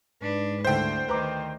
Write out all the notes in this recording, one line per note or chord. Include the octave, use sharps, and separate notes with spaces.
G#2 D4 B4
D2 D3 E4 C5 G5
D2 D#3 B4 A#5 D6